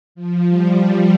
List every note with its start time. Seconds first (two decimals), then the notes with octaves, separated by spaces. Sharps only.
0.15 F3
0.48 G3